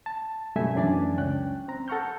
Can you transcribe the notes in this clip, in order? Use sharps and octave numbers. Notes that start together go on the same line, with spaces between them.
A5
F#2 B2 G3 A3 E5 G#5
F#2 E3 D4 D5 G#5 A6
C#2 C#4 G5 F#6
C4 A#5
A4 F#5 A#5 C#6 F6 G6